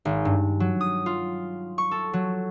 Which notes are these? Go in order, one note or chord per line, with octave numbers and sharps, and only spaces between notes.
G#1
G2
F#3
D#6
F4
C#6
A4
F#3